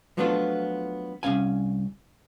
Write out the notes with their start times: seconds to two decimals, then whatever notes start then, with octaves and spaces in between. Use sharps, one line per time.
0.17 F3 F#3 A3 B3 D4 F4
1.23 C2 C3 C#4 F5 G#5